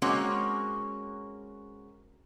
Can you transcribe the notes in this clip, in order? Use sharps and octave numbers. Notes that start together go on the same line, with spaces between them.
G#3 A#3 C4 C#4 F#4 C#5